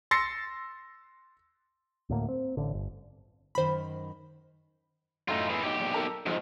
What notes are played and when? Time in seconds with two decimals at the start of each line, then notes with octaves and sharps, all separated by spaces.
0.11 C6 E6 A6 A#6 C7 C#7
2.09 D2 A2 A#3
2.29 C4
2.57 A1 D3
2.74 G1
3.55 F#2 D#3 A#4 C5 B5
5.28 F#2 A2 A3 D#4 F4
5.49 E3 G#4
5.63 B1 D#4 G4
5.79 A#1
5.94 A4 A#4 A#5
6.26 B1 G#2 F3 G#3